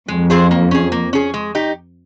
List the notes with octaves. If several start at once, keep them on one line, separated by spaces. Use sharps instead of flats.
F2 G#3
C4 F4 G#4 C5
A#3
C#4 G#4
A#3
C#4 G#4
G#3
D#4 G4